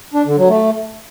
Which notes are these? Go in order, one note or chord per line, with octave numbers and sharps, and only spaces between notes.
D4
D3
F#3
A3